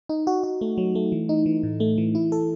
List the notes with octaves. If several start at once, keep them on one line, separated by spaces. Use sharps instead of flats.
D#4
F#4
F#4
A3
F#3
A3
E3
D#4
E3
A2
A3
E3
E4
A4